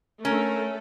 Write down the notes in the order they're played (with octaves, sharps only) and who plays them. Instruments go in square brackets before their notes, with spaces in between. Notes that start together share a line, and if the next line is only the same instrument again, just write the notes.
[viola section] A3 A4 [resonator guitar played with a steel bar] C#4 [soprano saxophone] A#4